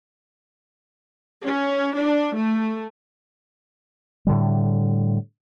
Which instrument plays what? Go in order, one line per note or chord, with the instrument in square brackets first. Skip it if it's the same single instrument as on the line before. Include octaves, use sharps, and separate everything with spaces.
[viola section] C#4
D4
A3
[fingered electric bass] A2 D3 G3